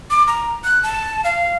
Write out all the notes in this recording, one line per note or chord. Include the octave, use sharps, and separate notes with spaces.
D6
A#5
F#6
A5
F5